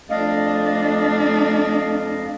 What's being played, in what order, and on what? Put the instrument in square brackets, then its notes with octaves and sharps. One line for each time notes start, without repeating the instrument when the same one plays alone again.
[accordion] F2 D#5 F5 [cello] A3 D4